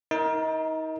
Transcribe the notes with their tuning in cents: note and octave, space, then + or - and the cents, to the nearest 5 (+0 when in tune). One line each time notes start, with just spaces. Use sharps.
D#4 +30 A#4 +0